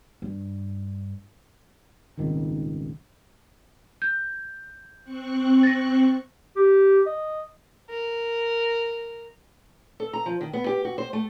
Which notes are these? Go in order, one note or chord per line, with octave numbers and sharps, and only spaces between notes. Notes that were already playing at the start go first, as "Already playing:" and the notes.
G2
D#1 G#1 C#2 D#3
G6
C4 C#6 F#6
A6 A#6
G4
D#5
A#4
A4
A#5
F3
D#3
B3
G4
F#4
C5
A3